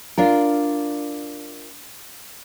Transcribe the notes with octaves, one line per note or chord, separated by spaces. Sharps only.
D4 F4 A#4